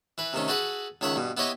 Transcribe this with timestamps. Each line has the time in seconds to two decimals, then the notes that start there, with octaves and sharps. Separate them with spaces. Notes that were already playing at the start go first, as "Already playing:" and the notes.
0.18 E3 B4
0.33 C3 D#3 A3 C#4
0.48 F#4 G#4 A4 B4 F#5
1.01 C#2 D#3 C#5 E5 F#5
1.16 G2 B2
1.37 B3 E4 G4 C#5 D#5 C#6